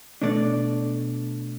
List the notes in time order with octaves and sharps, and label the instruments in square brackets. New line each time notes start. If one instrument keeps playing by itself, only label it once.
[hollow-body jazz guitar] B2 A3 D4 D5